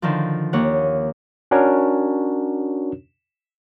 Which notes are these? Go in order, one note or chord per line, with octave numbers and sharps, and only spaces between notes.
D3 D#3 F3
D#2 A#3 C#5 F#5
C#4 D4 F#4 A#4 C#5